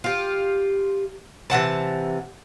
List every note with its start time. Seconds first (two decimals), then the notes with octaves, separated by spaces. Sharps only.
0.04 F4 G4
1.50 C3 E3 F#5 A5